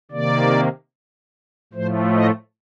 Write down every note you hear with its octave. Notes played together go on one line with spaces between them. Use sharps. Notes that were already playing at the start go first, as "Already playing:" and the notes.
C3 D#3 A#3 D5
A2 F3 A3 C5
D#5